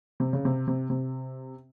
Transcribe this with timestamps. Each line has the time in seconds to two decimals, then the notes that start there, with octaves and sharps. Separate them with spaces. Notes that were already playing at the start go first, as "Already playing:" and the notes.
0.20 C3
0.33 C#3
0.45 C3
0.67 C3
0.90 C3